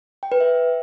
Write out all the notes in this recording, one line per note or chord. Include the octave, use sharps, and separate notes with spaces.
G5
B4
E5